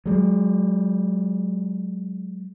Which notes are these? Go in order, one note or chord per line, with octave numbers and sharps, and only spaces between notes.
F#3 G#3